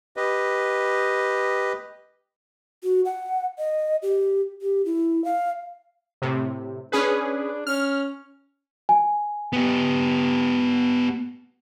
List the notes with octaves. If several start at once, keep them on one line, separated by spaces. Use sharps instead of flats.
G4 B4 D#5
F#4
F#5
D#5
G4
G4
E4
F5
A2 C3
C#4 D4 G#4 B4
C#4 F6
G#5
B3 G4